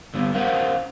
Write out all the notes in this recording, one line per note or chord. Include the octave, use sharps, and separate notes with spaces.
D3 G3 B3
C#4 A#4 C5 D#5 F5 F#5